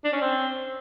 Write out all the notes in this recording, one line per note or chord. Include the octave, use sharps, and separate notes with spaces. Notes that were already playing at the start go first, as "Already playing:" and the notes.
D4
C#4
C4